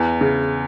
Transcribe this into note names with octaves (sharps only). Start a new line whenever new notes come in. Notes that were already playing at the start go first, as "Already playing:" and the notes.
Already playing: E2
C#3